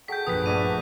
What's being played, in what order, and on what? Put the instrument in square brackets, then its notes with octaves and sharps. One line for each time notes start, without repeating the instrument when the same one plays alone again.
[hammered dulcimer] F#4 G#4 A4 [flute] G5 [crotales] G6 B6
[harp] A#1 G2 [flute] B4 [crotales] D#6 B6
[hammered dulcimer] A3 D4 F#4 [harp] G#5 A#6 [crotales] D#7